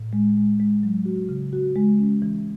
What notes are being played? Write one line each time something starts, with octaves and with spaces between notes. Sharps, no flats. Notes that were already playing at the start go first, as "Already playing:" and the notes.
Already playing: A2
G#3
G#3
G#3
F#3
F#4
C#3
F#4
G#3
C#4
E3